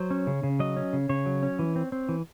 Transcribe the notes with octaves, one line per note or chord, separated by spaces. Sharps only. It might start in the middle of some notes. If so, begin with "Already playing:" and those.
Already playing: F#3 C5
C#4
C#3
C#3
F#3 D#5
C#4
C#3
C#3 C#5
F#3
C#4
E3
C4
C4
E3